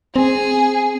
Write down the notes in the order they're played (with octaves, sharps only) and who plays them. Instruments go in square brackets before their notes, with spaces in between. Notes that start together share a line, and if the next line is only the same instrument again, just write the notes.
[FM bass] C4 [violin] G#4